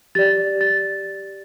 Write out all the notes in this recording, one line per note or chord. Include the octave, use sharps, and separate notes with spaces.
G4 D5 A6
A6